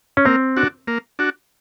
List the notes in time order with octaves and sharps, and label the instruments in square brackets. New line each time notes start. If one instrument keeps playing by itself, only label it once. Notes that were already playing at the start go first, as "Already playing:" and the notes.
[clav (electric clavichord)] C#4
[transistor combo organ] A#3 [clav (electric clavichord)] C4
[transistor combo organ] D4 F#4
A#3
D4 F#4